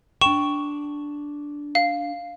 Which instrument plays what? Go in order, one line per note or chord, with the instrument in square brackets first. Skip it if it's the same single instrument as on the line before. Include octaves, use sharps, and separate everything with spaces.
[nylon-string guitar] D4 G5 [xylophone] C#6 E7
[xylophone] F5